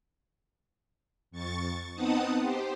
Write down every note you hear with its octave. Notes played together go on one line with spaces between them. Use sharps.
F2 C#6 A6
B3 C4 D#4 F#5 A5 D#6
G4 C5